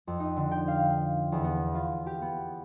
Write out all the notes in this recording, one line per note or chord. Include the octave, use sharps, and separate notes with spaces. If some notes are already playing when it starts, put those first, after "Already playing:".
F2
D#4
D3
G5
F5
E2
B3
F4
G4
B3